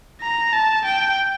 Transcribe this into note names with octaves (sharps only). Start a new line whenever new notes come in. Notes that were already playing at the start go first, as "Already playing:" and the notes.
A#5
A5
G5